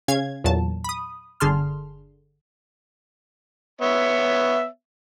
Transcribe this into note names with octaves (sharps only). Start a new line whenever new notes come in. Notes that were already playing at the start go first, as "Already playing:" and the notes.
C#3 C#4 F5 G#6
E2 A#2 F#3 A5
B5 D#6
G1 D3 G#4 A5 C6 F6
B3 C#5 E5